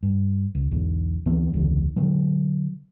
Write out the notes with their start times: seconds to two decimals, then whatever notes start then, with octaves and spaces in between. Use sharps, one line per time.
0.03 G2
0.55 C#2
0.71 B1 E2
1.26 D2 E3 B3 C4
1.53 E1 C#2 D3 E3
1.96 B2 D3 F#3